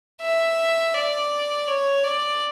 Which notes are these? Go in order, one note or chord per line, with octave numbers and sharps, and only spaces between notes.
E5
D5
C#5
D5